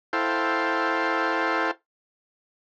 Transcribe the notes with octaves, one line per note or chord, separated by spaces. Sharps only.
E4 A4 C5 F5 G5